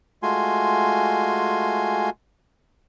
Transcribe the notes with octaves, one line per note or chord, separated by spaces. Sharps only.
G#3 A3 F4 F#4 G#5 C6